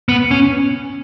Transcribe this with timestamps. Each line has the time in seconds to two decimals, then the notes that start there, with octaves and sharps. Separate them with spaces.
0.09 B3
0.31 C#4